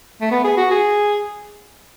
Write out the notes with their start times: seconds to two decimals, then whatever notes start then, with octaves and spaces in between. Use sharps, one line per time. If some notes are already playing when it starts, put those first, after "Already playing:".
0.21 A3
0.31 B3
0.44 G#4
0.57 F#4
0.71 G#4